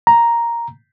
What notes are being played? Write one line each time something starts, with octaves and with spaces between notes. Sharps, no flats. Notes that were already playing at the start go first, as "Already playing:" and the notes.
A#5